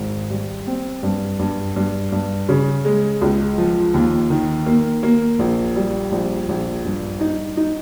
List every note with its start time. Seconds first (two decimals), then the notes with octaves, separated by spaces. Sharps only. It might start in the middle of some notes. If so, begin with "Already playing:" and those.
Already playing: G#1
0.30 G3
0.67 C4
1.03 G2
1.39 G2
1.76 G2
2.12 G2
2.49 C#3
2.85 G#3
3.21 C#2
3.58 F3
3.94 D#2
4.30 D#3
4.66 A#3
5.03 A#3
5.39 A#1
5.76 G3
6.12 A#1
6.49 A#1
6.85 G2
7.21 D#4
7.57 D#4